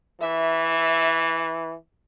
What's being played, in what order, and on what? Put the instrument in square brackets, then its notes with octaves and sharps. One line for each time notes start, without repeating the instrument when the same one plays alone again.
[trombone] E3 [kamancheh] E5